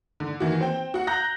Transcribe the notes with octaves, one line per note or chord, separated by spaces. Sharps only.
D3
D#3 E3 F#4
C4 G5
F#4 F#5
A#5 F#6 G6 A#6